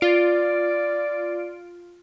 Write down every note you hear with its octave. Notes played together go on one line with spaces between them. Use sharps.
F4 D5 D7